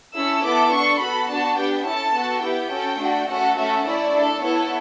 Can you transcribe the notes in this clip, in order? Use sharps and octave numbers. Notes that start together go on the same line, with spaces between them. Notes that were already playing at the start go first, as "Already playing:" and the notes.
C#4 E4 A4 E6
B3 E4 A4 D6
D4 A4 C#6
B3 F#4 A4 B5
B3 D4 F#4 A5
B3 D4 G4 G5
C#4 E4 A4 A5
B3 F#4 A4
B3 E4 G4 G5
C#4 F#4 A4
A3 D4 F#4
A3 C#4 F#4 A4 F#5
A3 C#4 F#4 A4 E5
A3 C#4 E4 D5
D4 A4
B3 E4 A4 C#5